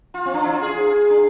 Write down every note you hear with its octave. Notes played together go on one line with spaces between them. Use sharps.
F4
C4
D4
E4
F4
G#4
D4